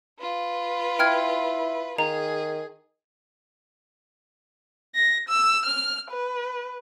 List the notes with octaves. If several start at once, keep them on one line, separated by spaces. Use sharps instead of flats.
F4 B4
E4 G5 F6 G#6
D#3 G#4 A#5
A#6
E6
F6
B4